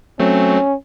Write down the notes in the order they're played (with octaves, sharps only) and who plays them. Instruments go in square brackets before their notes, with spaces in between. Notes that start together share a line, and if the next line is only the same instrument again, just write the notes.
[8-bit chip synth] F#3 A3 C4 [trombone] C#4